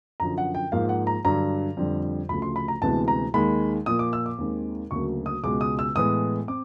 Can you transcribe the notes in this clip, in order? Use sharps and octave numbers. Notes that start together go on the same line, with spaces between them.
F#2 D3 F3 A#5
F#5
G5
G#2 F3 A#3 F5
F#5
A#5
G2 D3 F#3 A#5
F2 D3 G3
D2 C#3 F3 A3 B5
C6
B5
A#5
D2 C3 E3 G#3 B3 A5
A#5
D#2 D#3 G#3 B5
A#2 F3 A#3 D#6
D6
E6
D6
D#2 D#3 G#3 C4
D2 C#3 F#3 A#3 C#6
D#6
C#2 B2 G#3 D6
D#6
E6
A2 E3 G#3 B3 D#6
C4 D6